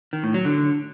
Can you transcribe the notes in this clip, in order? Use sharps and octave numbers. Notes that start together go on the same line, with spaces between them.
D#3
A2
F#3
D3